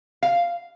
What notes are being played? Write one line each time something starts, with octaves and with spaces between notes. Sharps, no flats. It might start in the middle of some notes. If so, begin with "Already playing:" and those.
F5